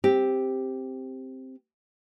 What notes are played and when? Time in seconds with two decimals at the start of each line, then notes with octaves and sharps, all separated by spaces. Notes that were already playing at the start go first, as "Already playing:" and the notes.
0.04 C4 G4